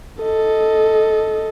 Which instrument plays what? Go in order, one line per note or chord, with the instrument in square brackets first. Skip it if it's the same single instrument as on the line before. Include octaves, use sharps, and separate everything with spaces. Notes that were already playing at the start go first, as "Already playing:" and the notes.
[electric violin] A4 D#5